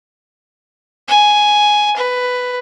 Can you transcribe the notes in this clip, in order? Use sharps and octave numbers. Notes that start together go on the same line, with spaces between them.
G#5
B4